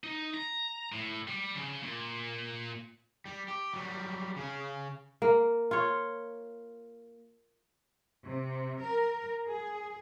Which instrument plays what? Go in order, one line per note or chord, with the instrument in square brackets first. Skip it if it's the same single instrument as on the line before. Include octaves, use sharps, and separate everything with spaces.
[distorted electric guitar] D#4
A#5
A2
G3
C#3
A#2
[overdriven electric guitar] G3
G4
F#3 G3
C#3 C#4
[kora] A#3
F4 C#5
[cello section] C3
A#4
G#4